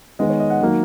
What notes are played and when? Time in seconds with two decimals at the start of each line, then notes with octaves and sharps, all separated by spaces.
0.19 D#3 G#3 B3 D#5
0.29 C#5
0.40 D#5
0.50 F#5
0.61 D#3 F#3 A#3